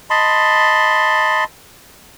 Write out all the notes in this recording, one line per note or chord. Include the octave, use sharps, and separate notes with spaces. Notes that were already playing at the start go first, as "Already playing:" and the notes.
D#5 A5 B5 C6